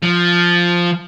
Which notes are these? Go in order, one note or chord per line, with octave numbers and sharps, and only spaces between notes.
F3